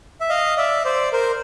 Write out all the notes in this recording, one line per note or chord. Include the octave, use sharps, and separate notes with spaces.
E5
D#5 F5
D5 E5
C5 D5
A#4 C5